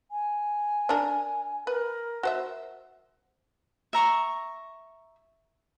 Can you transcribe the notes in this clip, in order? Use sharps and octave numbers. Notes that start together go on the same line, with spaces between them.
G#5
D4 A#4
A#4 B4
F#4 C5 E5
E5 A#5 C#6